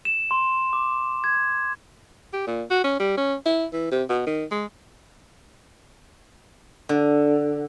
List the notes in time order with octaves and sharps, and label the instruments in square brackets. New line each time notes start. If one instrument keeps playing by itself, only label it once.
[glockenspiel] E7
C6
D6
G#6
[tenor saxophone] G4
A#2
F#4
C#4
G3
C#4
E4
E3
C3
B2
D#3
G#3
[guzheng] D3